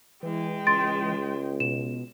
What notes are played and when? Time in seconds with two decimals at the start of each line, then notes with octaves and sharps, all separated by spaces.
0.23 E3 G#3 G5
0.67 C#2 C6 A6 D7
1.60 B2 E7